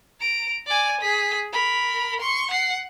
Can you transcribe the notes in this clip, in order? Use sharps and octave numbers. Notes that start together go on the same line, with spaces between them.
A#5 D7
D5 G#5
G#4 B6
A#4 B5
C6 C#6
F#5 C7